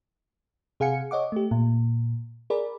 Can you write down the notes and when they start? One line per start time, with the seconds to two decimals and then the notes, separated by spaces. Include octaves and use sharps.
0.80 C3 G#4 F5 F#5 G#5 C#7
1.11 C#5 D#5 F#5 D6
1.32 A3 G4
1.51 A#2
2.50 G#4 A#4 D5 B5